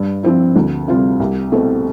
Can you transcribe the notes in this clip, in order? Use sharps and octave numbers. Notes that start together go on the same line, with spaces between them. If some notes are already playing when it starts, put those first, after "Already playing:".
Already playing: G2
F3 C4 E4
D2
C3 G3 C4 F4
C2
B2 A3 C4